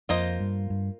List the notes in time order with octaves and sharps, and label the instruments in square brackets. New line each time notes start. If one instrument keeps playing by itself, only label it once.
[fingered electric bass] F2 [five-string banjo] A#3 F4 C5 D#5
[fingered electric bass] G2
G2